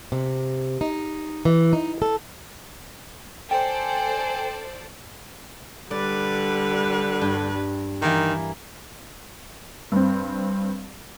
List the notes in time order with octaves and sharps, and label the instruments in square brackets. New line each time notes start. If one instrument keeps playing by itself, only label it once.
[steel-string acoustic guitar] C3
D#4
E3
D#4
A4
[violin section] A4 C5 D5 [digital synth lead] G5 [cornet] G#5
[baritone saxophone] D3 [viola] G3 B4 [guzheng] D5
[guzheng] G2
[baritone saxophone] D#3 [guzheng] E3 A#3
[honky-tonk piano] G2 C4